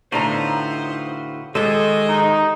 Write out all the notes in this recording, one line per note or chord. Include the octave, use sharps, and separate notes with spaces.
A2 D3 D#4 F#4 B4 C5 F5 A#5
D#3 G#3 G4 A4 C5 D#5
D#4